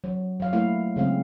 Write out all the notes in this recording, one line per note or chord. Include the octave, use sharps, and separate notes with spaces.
F#3
F#3 F5
A3 A#3 E4 F5
C#3 F#3 G#3 C4 F5